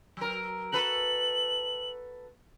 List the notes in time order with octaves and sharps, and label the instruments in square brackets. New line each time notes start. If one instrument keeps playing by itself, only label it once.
[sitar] F#3 A#4
[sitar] F#4 A4 B4 [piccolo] F#7